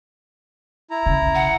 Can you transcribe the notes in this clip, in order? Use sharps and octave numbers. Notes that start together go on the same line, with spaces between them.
E4 A#5
C#3
F#5